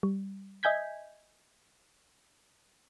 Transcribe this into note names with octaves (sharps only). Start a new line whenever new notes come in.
G3
D#5 E5 G#5 G6 G#6 B6